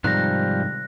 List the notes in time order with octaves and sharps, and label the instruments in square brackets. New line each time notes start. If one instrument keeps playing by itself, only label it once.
[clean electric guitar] G#2 C3 D#3 [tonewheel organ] F3 G3 [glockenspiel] F#6 A#6